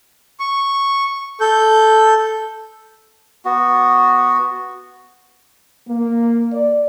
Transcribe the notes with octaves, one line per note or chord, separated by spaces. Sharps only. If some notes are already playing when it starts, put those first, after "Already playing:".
C#6
A4 G6
B3 F#4
A#3
D5